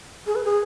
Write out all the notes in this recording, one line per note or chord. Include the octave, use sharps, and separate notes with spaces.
G#4
B4
G#4